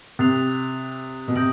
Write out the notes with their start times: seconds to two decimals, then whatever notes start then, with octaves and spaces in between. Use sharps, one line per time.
0.19 C3 D#6 F#6 A6 C7 F7
1.28 B2
1.36 C3 D#6 G6 A#6 D7 F#7